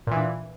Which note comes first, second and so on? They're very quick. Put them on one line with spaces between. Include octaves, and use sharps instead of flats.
A#2 E3 D4